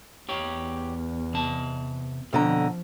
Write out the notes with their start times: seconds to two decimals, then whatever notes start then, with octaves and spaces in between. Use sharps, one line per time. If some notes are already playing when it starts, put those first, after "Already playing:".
0.29 E2 G4 C#5
1.34 C3 A5
2.33 F2 B2 D3 F3 A#5